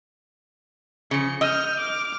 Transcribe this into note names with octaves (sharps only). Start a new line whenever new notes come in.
C#3 F3 C#7
D#5 F6 G6
D6 F6